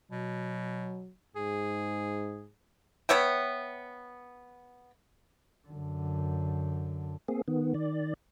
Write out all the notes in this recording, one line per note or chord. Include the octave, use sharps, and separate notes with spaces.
B2 F#3
G#2 G#4
B3 C#5 E5 G5
F#2 D3
A#3 C4 G#4
D#3 B3
D#3 D5